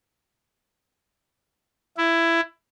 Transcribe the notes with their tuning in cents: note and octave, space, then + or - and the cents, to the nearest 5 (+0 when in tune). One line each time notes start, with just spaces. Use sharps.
E4 +15